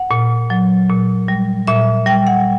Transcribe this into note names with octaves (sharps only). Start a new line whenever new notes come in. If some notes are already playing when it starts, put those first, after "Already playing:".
Already playing: F#5
A#2
F#3
A#2
G3
A#2 E5
G3 G5
F#5